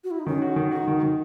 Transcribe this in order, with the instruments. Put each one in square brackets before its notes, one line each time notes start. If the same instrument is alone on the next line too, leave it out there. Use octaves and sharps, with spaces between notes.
[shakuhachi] F#4
E4
D#4
[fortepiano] D#3 [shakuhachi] C#4
[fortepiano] F#4
D#3
[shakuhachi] D#4 [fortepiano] F#4
[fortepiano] D#3
D#3